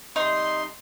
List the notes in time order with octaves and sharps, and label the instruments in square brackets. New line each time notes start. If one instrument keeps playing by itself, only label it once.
[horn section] C3 G3 C6 [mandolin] D#4